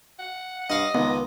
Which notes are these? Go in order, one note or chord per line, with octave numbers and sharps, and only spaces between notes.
F#5
G2 D#5 F5 F#5
C#2 D#3 B3